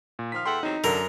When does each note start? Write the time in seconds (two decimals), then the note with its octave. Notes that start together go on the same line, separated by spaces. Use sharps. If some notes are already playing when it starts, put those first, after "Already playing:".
0.19 A#2
0.32 D#3 F3 F4 F6 B6
0.46 E2 A4 E5 F#5 G5 C6
0.63 E2 F#3 C4 D#4
0.84 F#2 D3 A#4